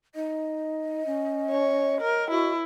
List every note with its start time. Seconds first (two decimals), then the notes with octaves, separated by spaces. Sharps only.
0.15 D#4 D#5
1.06 C#4
1.50 C#5
2.01 A#4
2.31 E4 F#4